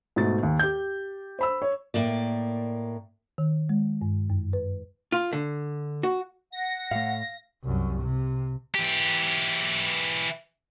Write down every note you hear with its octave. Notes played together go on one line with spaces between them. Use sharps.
G#2 B2 A3 A6
D#2
G4 G6
C5 B5 E6
C#5
A2 A#3 D5
D#3
G#3
G2
F#2
B4
F4
D3
F#4
F#5 A#6
A2 A3 F5
C2 F#2
C3
E3 G4